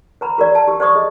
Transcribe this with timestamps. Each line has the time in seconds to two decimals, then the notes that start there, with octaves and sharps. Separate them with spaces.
0.21 B4 A#5 B5
0.38 G4 A#4 B4 D5
0.55 A5
0.68 G4
0.80 C5 D5 C#6 D#6
0.95 G#4 D#5